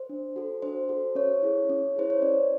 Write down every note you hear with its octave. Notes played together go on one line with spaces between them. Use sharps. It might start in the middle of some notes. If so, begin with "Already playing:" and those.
Already playing: C5
D4
F#4 A4
D4 C5
F#4 A4
C#4 C#5
E4 G#4
C#4
E4 G#4 C5
C#5
C#4 D5